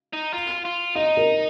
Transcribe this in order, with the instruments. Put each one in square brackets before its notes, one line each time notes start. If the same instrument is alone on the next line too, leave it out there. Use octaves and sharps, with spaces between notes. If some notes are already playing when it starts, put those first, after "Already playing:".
[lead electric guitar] D#4
F4
F4
[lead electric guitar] D#4 [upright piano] D#5
[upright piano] A#4